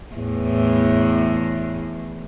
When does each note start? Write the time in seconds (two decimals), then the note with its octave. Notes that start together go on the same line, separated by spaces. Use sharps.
0.15 E2 A2